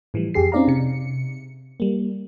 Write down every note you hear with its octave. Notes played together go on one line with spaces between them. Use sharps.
A2 E3 F3 G3
F2 G4 G#4 C7
C4 C#4 D#4 D5 F5 A#5
C3 C#7
G3 A#3